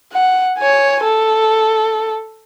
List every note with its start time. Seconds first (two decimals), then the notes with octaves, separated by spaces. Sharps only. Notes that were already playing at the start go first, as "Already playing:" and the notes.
0.13 F#5
0.58 C#5 G#5
1.04 A4